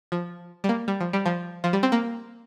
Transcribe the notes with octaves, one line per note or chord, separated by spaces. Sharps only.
F3
G3
A#3
G3
F3
G3
F3
F3
G3
C4
A#3